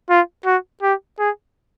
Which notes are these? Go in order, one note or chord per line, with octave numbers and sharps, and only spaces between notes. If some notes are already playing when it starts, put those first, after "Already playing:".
F4
F#4
G4
G#4